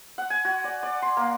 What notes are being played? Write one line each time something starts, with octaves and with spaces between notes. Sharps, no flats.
F#5
G#5
F#4
D5
D5
C6
A#3